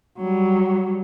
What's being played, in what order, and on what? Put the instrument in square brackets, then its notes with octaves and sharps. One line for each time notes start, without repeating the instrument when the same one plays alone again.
[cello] F#3 G3